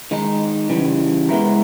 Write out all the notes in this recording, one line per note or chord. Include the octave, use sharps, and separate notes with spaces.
D#3 G#3 D#4
C#3 E3 G3
G#3 B3 E4 A#4